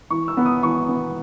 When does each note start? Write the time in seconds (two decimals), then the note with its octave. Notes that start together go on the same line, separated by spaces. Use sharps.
0.10 E3 C#6
0.28 E6
0.37 B3
0.46 D#6
0.63 E3 C#6
0.89 B3